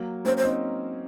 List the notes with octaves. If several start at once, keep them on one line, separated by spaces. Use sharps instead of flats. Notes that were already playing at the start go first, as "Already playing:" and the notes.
Already playing: F#3 A#3
A#3 C#4 C5
C5
C4 D#4